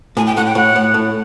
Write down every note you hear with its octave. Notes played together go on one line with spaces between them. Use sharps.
A2 G#5
G5
A2 F#5
G5
A2 F#5
A2
A2